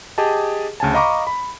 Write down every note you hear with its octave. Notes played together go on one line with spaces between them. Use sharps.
G4 G#4 D#5 A5
D2 C#3 G#5 A5
D#5 F5 A#5 B5 C#6 D6
B5